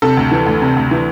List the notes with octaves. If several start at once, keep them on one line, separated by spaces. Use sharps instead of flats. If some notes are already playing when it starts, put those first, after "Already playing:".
C3 A4
D2
E3
D2
C3
D2
E3